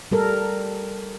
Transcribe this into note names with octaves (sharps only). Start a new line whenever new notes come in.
G3 A4 A#4